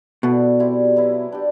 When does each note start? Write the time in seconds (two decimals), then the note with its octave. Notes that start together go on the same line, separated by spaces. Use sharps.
0.23 B2 E4 A4 D5
0.59 G3 C4 E4 G4
0.96 F#3 B3 E4
1.32 D4 G4